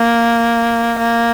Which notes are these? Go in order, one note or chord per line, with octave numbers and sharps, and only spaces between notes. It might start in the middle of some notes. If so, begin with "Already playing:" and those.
Already playing: A#3
A#3